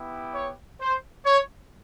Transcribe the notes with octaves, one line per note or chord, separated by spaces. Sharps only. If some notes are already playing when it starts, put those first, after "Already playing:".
Already playing: B3 E4 G4
C#5
C5
C#5